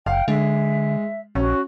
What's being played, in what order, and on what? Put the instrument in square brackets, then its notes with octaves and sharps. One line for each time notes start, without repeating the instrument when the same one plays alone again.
[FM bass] F#1 [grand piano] F5 [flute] G5
[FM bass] D3 [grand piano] G#3 [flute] E5
[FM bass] A#1 [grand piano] C#4 [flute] F#4